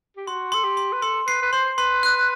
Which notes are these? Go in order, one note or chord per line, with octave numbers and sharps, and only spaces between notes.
G4
F#4 C6
A4 C6
G4
C6
B4
A4 C6
B4 C7
B4
C5 C6
B4 C6
F#6